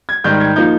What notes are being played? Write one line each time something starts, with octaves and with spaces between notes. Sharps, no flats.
G#6
G#2 D#3 G3 G6
G#6
F3 A#3 D#4 G6